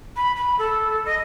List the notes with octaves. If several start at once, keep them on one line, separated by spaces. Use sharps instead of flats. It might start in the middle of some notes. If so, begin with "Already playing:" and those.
B5
B5
A4
D#5